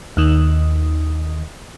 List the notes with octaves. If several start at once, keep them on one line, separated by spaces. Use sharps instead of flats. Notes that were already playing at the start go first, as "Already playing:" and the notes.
D#2 D#3